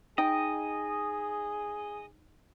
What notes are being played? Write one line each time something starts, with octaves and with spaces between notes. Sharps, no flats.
D#4 G#4 D#5 G5